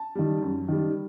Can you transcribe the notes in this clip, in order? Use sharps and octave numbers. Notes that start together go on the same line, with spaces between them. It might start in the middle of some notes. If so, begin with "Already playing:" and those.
Already playing: A5
D#3 G3
F#2
D#3 G3